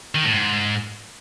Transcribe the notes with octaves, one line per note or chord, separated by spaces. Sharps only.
D#3
A2
G#2